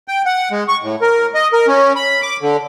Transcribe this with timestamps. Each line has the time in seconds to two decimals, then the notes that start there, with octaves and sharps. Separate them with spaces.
0.08 G5
0.26 F#5
0.51 G#3
0.68 C#6
0.82 A2
1.02 A#4
1.35 D#5
1.53 A#4
1.67 C#4
1.96 B5
2.22 D6
2.42 D3